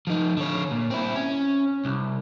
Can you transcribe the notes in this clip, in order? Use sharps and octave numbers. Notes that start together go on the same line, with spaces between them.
F3 D#4
D3 C#5
A#2
C4 E4
C#4
C2